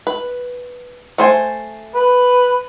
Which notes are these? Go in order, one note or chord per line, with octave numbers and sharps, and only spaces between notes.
B4
A3 C5 G#5
B4